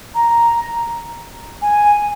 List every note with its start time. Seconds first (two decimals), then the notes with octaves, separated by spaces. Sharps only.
0.15 A#5
1.62 G#5